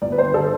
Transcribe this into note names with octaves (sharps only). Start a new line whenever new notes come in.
G1 D5
B4
C5
D3
A4